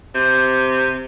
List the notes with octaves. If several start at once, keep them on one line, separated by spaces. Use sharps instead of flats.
C3 G6